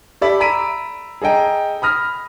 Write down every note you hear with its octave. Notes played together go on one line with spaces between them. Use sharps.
G4 A4 D5 E5 B5
A#5 B5 E6 B6 D7 D#7
G#4 A4 D#5 G5 A#5
B5 D#6 F6 A#6